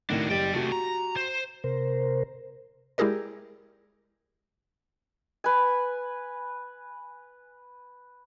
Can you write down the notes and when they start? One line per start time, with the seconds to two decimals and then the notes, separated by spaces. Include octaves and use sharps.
0.10 A2 D#3 D4 F#4
0.30 F#1 G4 D5 G5
0.53 C3 A3 F#4 G4
0.72 A#5
1.16 C5
1.64 C3 A#4 C5
2.98 G#3 E4 G4 G#4 A#4 D5
5.44 B4 G#5